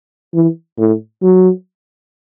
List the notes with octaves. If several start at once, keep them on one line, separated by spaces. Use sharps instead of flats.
E3
A2
F#3